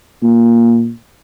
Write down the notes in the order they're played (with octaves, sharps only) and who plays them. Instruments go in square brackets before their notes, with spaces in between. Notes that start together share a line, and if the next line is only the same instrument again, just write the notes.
[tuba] A#2